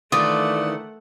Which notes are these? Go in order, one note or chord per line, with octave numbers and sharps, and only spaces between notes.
D#3 E3 A3 D4 F4 D5 F#5 D#6